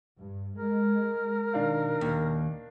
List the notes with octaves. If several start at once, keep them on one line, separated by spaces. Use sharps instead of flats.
G2
G#3 A#4
B2 D#3 D4 F5
D#2